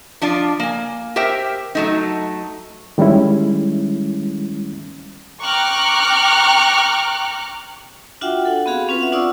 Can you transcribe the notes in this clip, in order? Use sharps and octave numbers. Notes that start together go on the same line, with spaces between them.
F3 D4 F4 D5
A#3 G#5
G4 A#4 C5 E5 G5
F#3 A3 D#4
D#3 G3 G#3 C#4 E4
G5 A#5 C#6 D6 F6 F#6
D4 F4 F#4 E5 F#5 G5
A4 F#5
B3 C4 F#4 G#4 F5
C4 C#4 F4 B4
E5 F#5
D4 F4 D5 C#6 D#6 E6